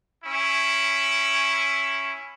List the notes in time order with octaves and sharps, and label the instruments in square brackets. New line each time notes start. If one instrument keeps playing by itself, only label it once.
[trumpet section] C#4 E4